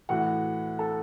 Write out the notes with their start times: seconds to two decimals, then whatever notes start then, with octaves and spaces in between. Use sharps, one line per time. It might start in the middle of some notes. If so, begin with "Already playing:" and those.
0.09 A2 E3 F#4 F#5
0.79 A4 A5